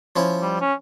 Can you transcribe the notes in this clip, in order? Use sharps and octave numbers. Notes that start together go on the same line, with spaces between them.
F3 C#4 E4
G3
C#4